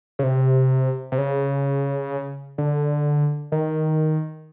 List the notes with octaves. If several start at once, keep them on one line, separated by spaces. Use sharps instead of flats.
C#3
C3
C3
C#3
D3
D#3